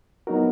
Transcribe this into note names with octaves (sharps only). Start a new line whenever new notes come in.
F#3 B3 D#4 F#4 A#4